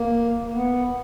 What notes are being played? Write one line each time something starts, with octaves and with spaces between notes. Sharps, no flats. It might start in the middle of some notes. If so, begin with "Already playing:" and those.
Already playing: A#3
A#3
B3